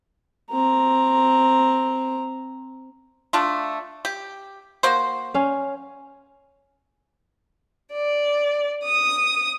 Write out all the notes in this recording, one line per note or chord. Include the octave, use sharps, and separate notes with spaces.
C4 A#5
A3 D4 F4
G4
A#3 F#4 C5
C#4 F5
D5
D#6